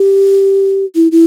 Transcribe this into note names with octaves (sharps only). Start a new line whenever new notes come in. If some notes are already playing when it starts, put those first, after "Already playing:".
Already playing: G4
E4
E4